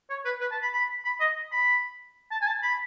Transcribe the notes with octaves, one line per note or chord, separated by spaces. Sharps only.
C#5
B4
B4
A5
B5
B5
B5
D#5
B5
A5
G#5
A5
B5